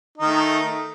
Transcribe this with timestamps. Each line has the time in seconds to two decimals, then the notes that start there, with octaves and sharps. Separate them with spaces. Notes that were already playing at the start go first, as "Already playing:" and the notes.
0.18 D#4
0.22 D#3
0.26 A3